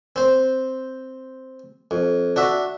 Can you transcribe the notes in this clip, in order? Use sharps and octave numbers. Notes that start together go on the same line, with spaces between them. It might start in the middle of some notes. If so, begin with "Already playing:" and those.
C4 C5
F2
D4 F#4 E5